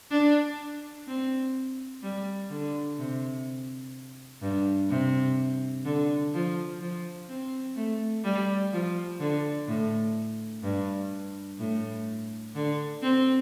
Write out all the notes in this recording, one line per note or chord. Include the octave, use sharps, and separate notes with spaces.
D4
C4
G3
D3
C3
G2
C3
D3
F3
F3
C4
A3
G3
F3
D3
A2
G2
A2
D3
C4